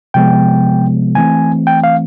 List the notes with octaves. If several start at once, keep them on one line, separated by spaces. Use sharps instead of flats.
C3 F3 G#3 B3 G5
E3 A3 C4 G#5
G5
F5